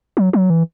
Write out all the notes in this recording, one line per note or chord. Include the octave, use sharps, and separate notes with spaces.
F#3
F#3
E3